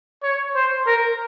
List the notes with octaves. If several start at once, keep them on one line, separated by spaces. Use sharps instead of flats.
C#5
C5
A#4